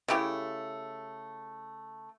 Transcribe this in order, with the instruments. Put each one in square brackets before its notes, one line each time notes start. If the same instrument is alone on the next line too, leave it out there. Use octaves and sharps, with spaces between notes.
[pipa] C#3 A3 E4 G4